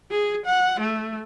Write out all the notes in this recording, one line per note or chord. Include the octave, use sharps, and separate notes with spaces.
G#4
F#5
A3